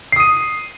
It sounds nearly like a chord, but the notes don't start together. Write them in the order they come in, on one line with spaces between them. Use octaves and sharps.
C7 D#6 D#7